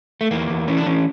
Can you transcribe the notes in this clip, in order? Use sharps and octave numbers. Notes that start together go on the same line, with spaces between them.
A3
E2 A#3
E2
E3 C#4
D4
E3 C#4